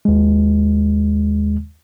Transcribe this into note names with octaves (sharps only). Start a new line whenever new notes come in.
D#2 G#3